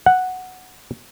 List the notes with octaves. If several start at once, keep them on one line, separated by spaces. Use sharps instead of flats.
F#5